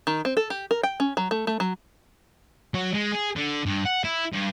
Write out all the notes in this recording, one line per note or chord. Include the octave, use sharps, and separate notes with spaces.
D#3
C4
A4
G4
A#4
G5
C#4
F#3
A3
A3
F#3
F#3
G#3
G#4
D3
G2
F#5
E4
G2